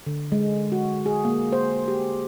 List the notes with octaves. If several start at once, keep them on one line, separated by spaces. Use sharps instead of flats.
D3
G#3
F#4
G#4
A#3
C5
G4